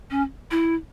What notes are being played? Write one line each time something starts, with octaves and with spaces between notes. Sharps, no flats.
C#4
E4